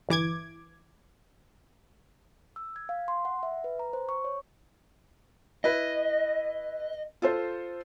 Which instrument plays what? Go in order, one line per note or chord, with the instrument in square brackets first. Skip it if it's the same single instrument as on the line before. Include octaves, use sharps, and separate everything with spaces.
[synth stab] G1 E3 D6 G#6
[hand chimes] E6
G#6
F5
C6
F#5
E5
B4
A#5
C5
C#6
C#5
[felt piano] E4 B4 [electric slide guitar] D#5
[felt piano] F4 A4 C5